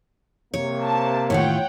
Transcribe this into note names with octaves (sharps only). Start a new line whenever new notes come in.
C3 A#3 C#5
A5
A2 D#3 F4 C#5 F#5 G5